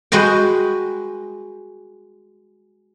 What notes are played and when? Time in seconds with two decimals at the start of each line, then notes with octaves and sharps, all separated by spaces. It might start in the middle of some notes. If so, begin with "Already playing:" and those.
0.12 G#3 F#4 B4 D#5 G5